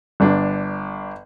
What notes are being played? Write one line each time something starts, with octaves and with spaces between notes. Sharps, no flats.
G1 D4